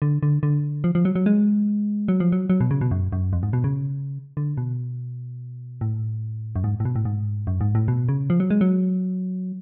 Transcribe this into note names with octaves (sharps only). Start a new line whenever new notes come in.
D3
D3
D3
F3
F3
F#3
F#3
G#3
F#3
F3
F#3
F#3
B2
C#3
B2
F#2
F#2
F2
G#2
B2
C#3
D3
B2
A2
F#2
G#2
A2
B2
A2
G#2
F#2
G#2
A2
B2
C#3
F3
F#3
G#3
F#3